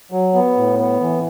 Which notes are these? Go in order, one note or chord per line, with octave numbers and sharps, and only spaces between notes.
F#3
B3
A2
B3
E3